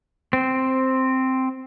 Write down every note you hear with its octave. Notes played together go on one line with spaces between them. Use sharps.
C4